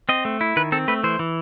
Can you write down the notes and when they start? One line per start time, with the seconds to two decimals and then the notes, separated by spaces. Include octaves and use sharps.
0.09 C4 D#5
0.25 A3
0.41 E4
0.56 D#3 B4
0.72 C4 A4
0.88 A3 B4
1.04 E3 C5
1.19 E3